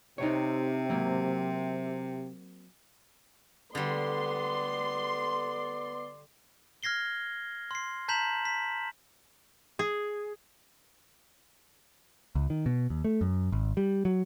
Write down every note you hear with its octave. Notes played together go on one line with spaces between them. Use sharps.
C3 D#4 C#5
F#3 A#3 C4
D3 G3 B3 D5 C6
F6 G#6 A#6 C7 G7
C6 C7
A5 A#5 G6 B6 E7 F#7
B6
G#4
C#2
D#3
B2
D#2
A3
F#2
G#1
G3
F#3